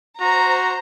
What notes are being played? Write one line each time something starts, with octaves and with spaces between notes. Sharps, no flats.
F#4 C5 A#5